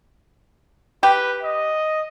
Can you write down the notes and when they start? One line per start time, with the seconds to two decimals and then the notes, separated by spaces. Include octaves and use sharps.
1.03 G4 B4
1.43 D#5